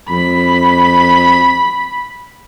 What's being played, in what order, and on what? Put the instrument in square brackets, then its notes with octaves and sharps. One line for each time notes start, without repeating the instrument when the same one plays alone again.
[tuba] F2 [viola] B5